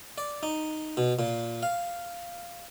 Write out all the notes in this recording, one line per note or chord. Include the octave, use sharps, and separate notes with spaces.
D5
D#4
B2
A#2
F5